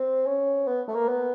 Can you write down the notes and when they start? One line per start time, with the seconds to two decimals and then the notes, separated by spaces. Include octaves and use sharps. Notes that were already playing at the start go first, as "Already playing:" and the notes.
Already playing: C4
0.26 C#4
0.67 B3
0.88 A3
0.95 A#3
1.08 B3